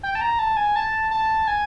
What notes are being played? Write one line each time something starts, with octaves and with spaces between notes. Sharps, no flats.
G5
A5
A#5
A5
G#5
A5
A5
G#5